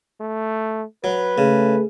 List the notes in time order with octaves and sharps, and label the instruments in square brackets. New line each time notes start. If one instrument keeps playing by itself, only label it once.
[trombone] A3
[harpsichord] F#3 [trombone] B4
[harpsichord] C#3 [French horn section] A3 G#4